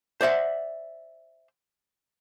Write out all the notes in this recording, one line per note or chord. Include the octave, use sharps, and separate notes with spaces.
C5 D5 E5 F#5